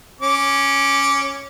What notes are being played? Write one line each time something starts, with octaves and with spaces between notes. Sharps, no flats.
C#4 D6